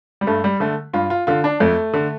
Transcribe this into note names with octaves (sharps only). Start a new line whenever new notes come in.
G3
G2 A3
G3
D3 A3
G2 F4
F4
D3 F4
D4
F2 A3
D3